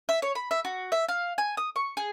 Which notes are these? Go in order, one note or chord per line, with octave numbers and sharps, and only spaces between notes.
E5
C#5
B5
E5
F#4
E5
F5
G#5
D#6
C#6
G#4